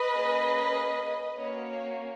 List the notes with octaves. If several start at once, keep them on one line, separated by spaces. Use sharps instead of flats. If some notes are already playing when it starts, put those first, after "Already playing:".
Already playing: B4 D#5
A#3 C#4 G#4
A#3 C#4 F#4 C#5